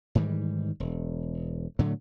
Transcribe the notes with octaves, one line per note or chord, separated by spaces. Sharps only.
G#2 D#3 E3 G3
E1
A2 D3 F#3 A3